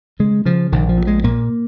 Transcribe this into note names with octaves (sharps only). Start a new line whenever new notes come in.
C#3 G#3
C#3 F3
A#1 D#3
F3
A#2
G#3
A#2 A#3